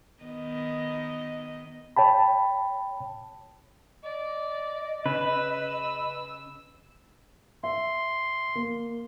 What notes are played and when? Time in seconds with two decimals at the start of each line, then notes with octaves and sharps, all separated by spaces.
0.23 D#3 B3 D#5
1.96 C#5 G5 A5 B5
4.03 D5 D#5
5.06 C#3 B4 E6
7.63 E5 C6
8.55 A#3